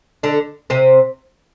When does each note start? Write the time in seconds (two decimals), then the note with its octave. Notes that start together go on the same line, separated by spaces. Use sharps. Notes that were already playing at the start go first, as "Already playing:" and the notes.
0.23 D3 D4
0.70 C3 C4